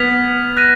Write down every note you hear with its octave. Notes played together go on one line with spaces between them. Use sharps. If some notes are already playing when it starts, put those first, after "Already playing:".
Already playing: B3 F6 G#6 B6 F7
F#6 A#6 D#7